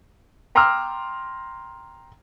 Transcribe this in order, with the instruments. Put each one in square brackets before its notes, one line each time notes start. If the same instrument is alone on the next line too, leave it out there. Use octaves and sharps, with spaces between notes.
[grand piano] G5 A#5 C6 D6 E6 F6